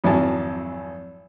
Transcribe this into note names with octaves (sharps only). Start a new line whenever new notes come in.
G#1 F2 F#3 E4 G#5 A5